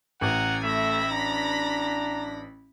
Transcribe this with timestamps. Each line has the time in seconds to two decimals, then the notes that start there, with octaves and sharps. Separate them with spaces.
0.21 A1 F#5 G#5 A#5
0.64 A3 E5 B5 A#6
1.12 D4 A#5